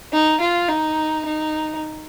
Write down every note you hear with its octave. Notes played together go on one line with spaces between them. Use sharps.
D#4
F4
D#4
D#4